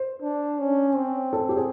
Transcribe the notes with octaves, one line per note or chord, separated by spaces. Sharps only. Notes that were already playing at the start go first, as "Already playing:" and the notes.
Already playing: C5
D4
C#4
C4
A4
G4
G#4